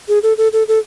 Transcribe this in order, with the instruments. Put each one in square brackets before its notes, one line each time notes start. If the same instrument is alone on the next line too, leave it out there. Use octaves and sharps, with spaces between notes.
[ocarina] G#4
A4
A4
A4
A4